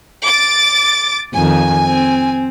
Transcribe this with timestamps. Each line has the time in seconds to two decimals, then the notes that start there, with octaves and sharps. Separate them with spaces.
0.22 D6 A6
1.33 F2 D#3 G#5
1.85 C4